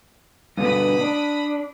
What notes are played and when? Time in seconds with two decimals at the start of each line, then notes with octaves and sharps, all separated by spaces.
0.58 G2 B2 D3 B5 D#6
1.01 D4